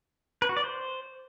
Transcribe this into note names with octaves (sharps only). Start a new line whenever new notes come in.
B4
F#4
D5
C5